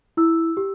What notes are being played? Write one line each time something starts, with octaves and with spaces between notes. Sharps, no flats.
E4 E6
G4